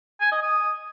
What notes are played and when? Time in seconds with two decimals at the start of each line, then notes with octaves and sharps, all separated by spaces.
0.21 G#5
0.32 D#5
0.43 D#6